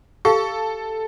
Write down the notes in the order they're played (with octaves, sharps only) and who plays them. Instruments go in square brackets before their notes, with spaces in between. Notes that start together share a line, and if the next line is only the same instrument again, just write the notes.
[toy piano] G4 F5 [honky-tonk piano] A4